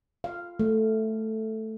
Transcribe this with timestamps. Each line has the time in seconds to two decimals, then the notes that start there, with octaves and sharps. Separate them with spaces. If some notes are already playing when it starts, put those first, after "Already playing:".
0.24 F5
0.59 A3